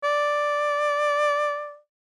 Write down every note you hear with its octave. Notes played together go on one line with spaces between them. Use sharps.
D5